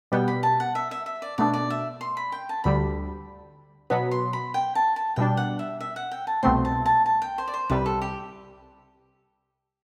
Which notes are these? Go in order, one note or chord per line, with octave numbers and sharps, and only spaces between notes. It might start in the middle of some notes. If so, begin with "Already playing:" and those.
B2 G3 B3 G5
B5
A5
F#5
E5
E5
E5
D5
B2 A3 D4 D5
D5
E5
C6
B5
G5
A5
D2 D3 G3 B5
B2 F#3 B3 B5
C6
B5
G5
A5
A5
B2 G3 D4 G5
F#5
E5
E5
F#5
G5
A5
C2 B2 A3 C4 C6
A5
A5
A5
G5
C5
D5
C5
C2 C3 G3 B4
A4
G4